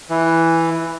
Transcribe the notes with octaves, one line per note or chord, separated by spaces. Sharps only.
E3